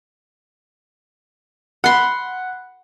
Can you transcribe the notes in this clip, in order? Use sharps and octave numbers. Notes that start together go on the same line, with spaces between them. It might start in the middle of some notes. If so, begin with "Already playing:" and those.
F#5 B5 C6